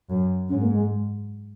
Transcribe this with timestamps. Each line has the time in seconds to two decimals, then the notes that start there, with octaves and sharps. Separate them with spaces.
0.10 F#2
0.49 G#2 C#4
0.59 A#3
0.72 G#3